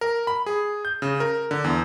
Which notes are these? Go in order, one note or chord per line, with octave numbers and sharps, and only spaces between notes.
A#4
B5
G#4
G6
C#3
A#4
D3
E2